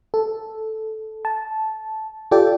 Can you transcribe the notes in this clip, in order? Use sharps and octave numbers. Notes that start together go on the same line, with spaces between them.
A4
A5
F4 G4 A4 D5 G5